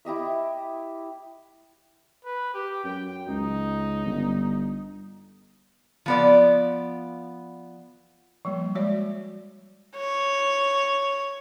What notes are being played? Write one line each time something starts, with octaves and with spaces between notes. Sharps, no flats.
E4 G4 D#5 E5
B4
G4
F#2 G5
C#2 D#4
G1
F3 B3 D5
F3 G3 A#3
G#3 F#4 C#5 D5
C#5